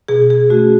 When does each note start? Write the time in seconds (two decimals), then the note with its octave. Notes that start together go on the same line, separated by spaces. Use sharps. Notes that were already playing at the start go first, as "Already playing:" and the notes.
0.08 B2 G#4
0.30 G#4
0.50 A3 F#4
0.55 C#4